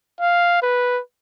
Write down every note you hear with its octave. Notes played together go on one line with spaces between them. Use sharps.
F5
B4